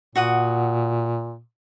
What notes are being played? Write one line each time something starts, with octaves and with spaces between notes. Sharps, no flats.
A#2 F#4 F#5 D#6